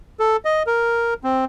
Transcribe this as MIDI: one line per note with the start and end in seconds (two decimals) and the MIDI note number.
0.20 0.37 69
0.45 0.63 75
0.67 1.14 70
1.24 1.45 60